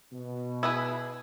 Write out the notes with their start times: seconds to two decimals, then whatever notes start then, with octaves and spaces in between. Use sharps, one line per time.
0.12 B2
0.63 E4 G#4 B4